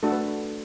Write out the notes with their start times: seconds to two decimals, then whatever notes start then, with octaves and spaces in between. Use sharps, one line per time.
0.03 A3 D4 F#4 A4
0.12 B4